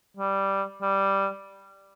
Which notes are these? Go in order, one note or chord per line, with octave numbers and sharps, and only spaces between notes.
G3
G3